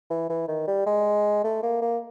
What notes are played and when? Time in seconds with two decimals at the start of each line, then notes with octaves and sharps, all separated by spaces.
0.10 E3
0.29 E3
0.48 D#3
0.68 G3
0.86 G#3
1.44 A3
1.63 A#3
1.82 A#3